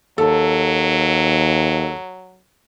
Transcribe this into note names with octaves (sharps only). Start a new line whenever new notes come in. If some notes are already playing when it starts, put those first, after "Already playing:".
D#2 F#3 A4